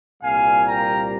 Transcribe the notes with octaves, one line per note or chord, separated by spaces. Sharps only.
C2 A#2 G3 A#3 F5 G#5
G5 A#5